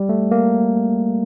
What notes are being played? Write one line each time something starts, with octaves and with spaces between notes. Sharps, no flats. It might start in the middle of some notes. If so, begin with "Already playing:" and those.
Already playing: G3
A3
A#3